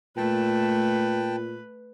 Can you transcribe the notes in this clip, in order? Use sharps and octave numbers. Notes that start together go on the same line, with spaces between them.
A#2 A3 B4 G5 A5